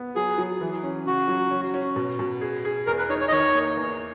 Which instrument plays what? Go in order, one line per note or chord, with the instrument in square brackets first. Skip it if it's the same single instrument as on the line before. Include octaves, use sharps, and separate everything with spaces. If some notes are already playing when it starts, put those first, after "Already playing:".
Already playing: [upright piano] B3
[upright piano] F#3 [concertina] G#4
[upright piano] F#3
E3
C#4
[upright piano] C#3 [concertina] F#4
[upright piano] F#3
C#4
C#4
B2
B2
G#4
G#4
[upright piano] E2 [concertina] A#4
[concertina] B4
[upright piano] D#4 [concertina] C#5
[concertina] C#5
D#5
[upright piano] D#3 [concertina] C#5
[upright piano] A#3
E2